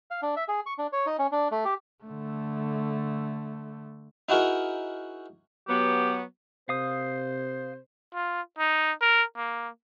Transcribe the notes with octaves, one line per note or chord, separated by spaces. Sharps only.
F5
D4
E5
G#4
C#6
D4
C#5
D#4
C#4
D4
A3
G4
D3 A3
D#4 E4 F#4 G#4 A#4
F#3 B3 G4
C3 C5 F5 D#6
F4
D#4
A#4
A#3